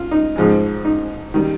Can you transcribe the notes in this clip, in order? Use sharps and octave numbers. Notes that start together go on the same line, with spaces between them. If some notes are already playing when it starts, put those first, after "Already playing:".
Already playing: F4
D#4
G#2 F3 G#3
D#4
D#3 G3